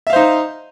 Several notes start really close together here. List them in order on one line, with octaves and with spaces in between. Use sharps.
E5 F5 C5 D#4